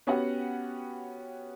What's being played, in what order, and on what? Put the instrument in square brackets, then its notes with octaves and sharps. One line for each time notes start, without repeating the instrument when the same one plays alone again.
[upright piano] B3 C#4 F#4 G4 F#5